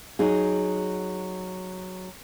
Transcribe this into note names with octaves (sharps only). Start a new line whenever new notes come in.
F#3 D#4 G#4